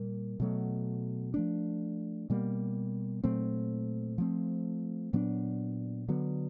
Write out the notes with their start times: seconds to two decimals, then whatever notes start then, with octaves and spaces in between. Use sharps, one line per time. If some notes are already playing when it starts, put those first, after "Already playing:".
Already playing: A#2 G3 A#3
0.40 B2 F#3 A3
1.34 F3 A3 D4
2.30 B2 G3 A#3
3.24 A#2 F#3 A3 C4
4.18 F3 A3 C4
5.13 A#2 F#3 B3 D4
6.08 D3 F#3 B3